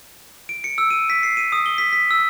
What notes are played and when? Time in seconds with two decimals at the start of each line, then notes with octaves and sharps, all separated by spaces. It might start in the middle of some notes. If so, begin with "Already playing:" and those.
0.49 D7
0.64 C#7
0.78 E6
0.91 D#7
1.10 B6
1.23 C7
1.37 D#7
1.52 D#6
1.66 G7
1.78 B6
1.93 B6
2.11 E6